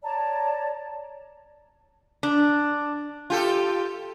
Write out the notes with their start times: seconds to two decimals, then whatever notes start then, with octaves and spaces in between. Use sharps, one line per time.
0.03 C#5 D5 A5 A#5
2.23 D4
3.30 F4 G4 A4